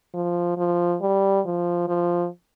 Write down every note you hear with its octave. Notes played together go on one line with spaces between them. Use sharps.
F3
F3
G3
F3
F3